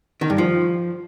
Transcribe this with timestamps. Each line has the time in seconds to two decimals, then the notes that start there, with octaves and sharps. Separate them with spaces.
0.21 D#3
0.30 G2
0.38 F3